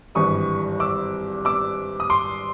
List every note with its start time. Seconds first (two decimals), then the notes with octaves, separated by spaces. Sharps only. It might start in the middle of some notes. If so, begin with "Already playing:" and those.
0.15 G#1 G2 E3 G3 C#6 D#6
0.80 D6 E6
1.45 D6 E6
2.00 D#6
2.10 C6 D6